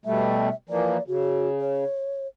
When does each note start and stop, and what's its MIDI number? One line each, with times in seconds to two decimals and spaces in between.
0.05 0.49 47
0.05 0.49 55
0.05 0.49 57
0.05 0.55 76
0.69 0.97 52
0.69 0.97 53
0.69 0.97 58
0.69 1.03 74
1.08 1.84 49
1.08 1.48 66
1.61 2.27 73